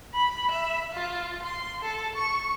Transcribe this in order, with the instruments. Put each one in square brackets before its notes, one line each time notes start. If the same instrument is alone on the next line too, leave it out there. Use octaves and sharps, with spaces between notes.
[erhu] B5
E5
F4
C6
A4
C#6